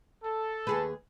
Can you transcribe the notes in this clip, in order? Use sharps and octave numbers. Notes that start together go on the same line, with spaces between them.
A4
D#2 G#4 B4